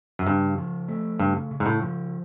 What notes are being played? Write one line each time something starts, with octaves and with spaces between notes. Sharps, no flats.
F#2
G2 C#3
F3
A3
G2 C#3
C#3
G#2
A2
F3